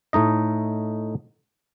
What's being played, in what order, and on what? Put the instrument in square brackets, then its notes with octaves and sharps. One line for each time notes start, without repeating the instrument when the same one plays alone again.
[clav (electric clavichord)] A2 A3 D#4 D#5